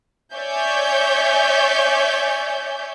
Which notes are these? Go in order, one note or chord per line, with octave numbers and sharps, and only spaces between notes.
C#5 D5 E5 G#5 G6